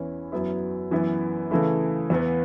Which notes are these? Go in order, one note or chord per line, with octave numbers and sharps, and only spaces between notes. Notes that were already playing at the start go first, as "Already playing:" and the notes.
Already playing: E2 E3 C#4 E4
F#2 F#3 B3 E4
F#2 E3 B3 E4
C#3 E3 A3 E4
E2 E3 B3